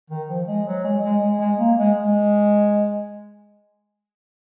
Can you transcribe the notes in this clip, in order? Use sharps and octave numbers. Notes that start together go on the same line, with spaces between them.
D#3
F3
G#3
F#3
G#3
G#3
G#3
G#3
A#3
G#3
G#3